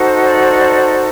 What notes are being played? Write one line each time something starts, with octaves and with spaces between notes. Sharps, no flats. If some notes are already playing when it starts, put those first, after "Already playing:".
Already playing: D#4 F#4 A4 C5
D5